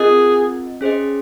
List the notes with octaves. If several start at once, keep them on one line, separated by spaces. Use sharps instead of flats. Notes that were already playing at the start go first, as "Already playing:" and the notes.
Already playing: C4 F4 G#4 A#4 D#5
C#4 G#4 C5 D#5